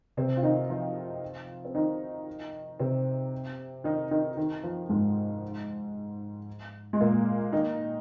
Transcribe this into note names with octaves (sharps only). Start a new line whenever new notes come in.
C3 C4
F4
D#3 D#4
F3 F4
C4
D#3 D#4
C3 C4
D#3 D#4
D#3 D#4
D#3
F3
G#2 G#3
G#3
A#2 A#3
D#3 D#4